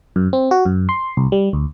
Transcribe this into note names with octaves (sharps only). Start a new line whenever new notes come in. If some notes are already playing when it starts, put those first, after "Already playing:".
F#2
C4
F#4
F#2
C6
C2
G3
D2